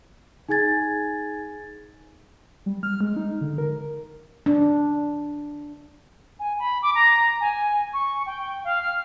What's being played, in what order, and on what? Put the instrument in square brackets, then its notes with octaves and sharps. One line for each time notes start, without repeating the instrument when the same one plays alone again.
[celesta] D#4 G#4 G#5 G#6 A6
[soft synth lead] G3
F6
G#3
D#4
D3
A#4
[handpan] D4
[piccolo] G#5
B5
D6
A#5
G#5
C#6
G5
F5
F6